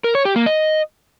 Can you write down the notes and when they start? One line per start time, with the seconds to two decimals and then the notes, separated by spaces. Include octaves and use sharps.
0.04 A#4
0.15 C#5
0.25 G4
0.36 A#3
0.46 D#5